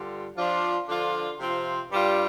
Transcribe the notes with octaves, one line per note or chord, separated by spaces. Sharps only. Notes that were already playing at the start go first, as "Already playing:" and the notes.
Already playing: G2 D3 G3 F4
F3 D4 F4
D3 F3 D4 F4
C3 F3 C4 F4
G2 G3 F4